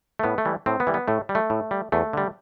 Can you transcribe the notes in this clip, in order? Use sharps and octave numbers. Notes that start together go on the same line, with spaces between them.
A3
A2 B3
A3
E3 G3
A2 C4
B3
E3 G3
B3
A2 A3
G3
A3
A2
G3
E2 A3
D3 G3